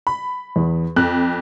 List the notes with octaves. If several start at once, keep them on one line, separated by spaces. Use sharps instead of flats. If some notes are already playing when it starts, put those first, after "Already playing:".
B5
E2
F2 F#6